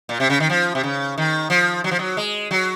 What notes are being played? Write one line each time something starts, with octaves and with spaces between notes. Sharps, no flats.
A#2
C3
C#3
D#3
F3
C3
C#3
D#3
F3
F#3
F3
F#3
G#3
F#3